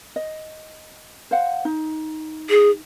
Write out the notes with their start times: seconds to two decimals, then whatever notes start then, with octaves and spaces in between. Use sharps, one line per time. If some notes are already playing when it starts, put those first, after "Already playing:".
0.16 D#5
1.31 C5 F5 F#5
1.65 D#4
2.50 G#4